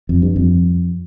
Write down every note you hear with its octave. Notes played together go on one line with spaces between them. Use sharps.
F2
G2
F2